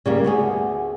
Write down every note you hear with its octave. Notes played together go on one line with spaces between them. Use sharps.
C#3 G3 A#3
D2 B3 G#4